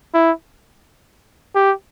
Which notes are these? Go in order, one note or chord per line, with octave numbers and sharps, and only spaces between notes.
E4
G4